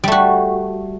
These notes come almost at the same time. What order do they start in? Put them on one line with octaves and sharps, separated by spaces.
G3 A3 F#4